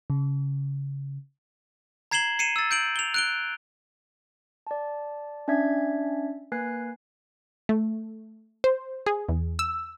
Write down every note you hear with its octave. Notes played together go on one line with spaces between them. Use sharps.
C#3
A#5 G#6 C7 E7 F#7 G7
C7 C#7 D#7 E7
E6 A6
G6 D7 F#7
F7 G7
F#6 D7 G7
D5 A5
C#4 D4 D5 E5 G#6 B6
A#3 B4 G#5 F#6 G#6 C7
A3
C5
G#4
E2
E6